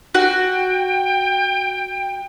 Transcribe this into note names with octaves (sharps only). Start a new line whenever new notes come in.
F#4 G5